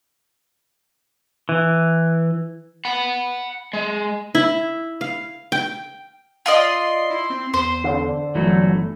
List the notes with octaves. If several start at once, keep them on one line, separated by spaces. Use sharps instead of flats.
E3
F#5 B5
G#3
E4
F5
G5
F4 D5 D#5 C6
E4
C4
E2 C5 C6
D3
G1 E3 F#3 A3